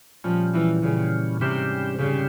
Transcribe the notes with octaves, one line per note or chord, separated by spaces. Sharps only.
A#2 F3 G3 C#4
E3
A#2 C#3 G3 C#4
G#2 C3 G3 C#4 G4 C5
G#2 C#3 G3 C#4 G4 C5